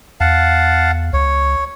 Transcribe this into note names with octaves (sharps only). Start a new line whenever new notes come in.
E2 F5 F#5 A5
C#2 C#5